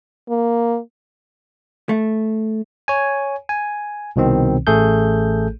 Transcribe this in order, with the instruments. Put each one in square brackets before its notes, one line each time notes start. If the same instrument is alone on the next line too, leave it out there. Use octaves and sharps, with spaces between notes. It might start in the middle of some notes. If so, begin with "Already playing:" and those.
[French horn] A#3
[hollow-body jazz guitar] A3
[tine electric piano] C#5 G#5
G#5
C2 B2 D#3 C4
A1 A3 G#4 A4 G6